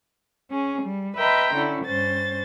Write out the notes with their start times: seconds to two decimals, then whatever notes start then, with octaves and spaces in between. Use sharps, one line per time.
0.51 C#4 G#4
0.83 G3
1.18 B4 D#5 E5 G5 A#5 C6
1.55 D3 C#4 E4
1.86 G2 C#4 C5 A6